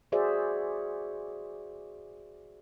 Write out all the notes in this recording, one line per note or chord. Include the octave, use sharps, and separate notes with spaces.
F#4 G#4 C5 D5 E5